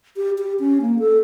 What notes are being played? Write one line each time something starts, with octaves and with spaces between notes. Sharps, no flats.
G4
G4
C#4
A#3
A4